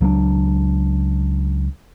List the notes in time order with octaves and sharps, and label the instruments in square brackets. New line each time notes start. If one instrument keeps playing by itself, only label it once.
[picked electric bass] C#2 F#3 A3 D4